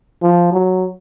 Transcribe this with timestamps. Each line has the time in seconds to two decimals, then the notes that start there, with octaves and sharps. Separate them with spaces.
0.22 F3
0.52 F#3